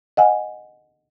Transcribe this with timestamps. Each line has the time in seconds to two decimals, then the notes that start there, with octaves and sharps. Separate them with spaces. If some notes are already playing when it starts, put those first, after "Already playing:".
0.17 D#5 F#5 G#5